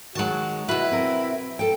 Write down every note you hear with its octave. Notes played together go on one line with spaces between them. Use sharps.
D#3 F#3 G#3 F#4 A5
B2 E4 F#4 B4
C4 A#4
A4 G5